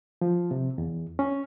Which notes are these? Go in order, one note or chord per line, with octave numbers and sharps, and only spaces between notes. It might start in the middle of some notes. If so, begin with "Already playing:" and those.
F3
C3
E2
C#4